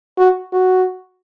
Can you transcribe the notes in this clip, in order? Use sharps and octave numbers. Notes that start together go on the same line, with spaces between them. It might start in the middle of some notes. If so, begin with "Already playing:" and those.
F#4
F#4